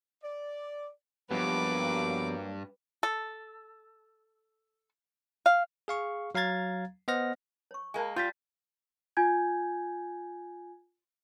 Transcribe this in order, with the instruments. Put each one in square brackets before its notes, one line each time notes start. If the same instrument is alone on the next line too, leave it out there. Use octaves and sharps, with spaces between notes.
[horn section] D5
[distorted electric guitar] G2 [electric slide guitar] F3 B3 G4 [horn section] F#3 A#3 [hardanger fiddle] B4 D6
[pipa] A4
F5
[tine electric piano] G#4 F5 C#6
F#3 F5 A#5 G#6 A6
B3 C5 D#5 F#5 F6 A#6
[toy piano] C#5 C#6
[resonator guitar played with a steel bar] G#3 A#3 [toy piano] G#5 A5
[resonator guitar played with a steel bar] G3 [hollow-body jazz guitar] F4 [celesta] G6 A6 B6
[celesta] F4 G#5 G6 G#6